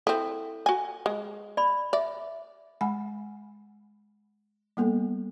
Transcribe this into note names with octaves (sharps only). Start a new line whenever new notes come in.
C4 E4 A4
F#4 G#5
G#3
D5 B5
D5 E5
G#3 F#5 G#5 B5
G3 A#3 B3 A4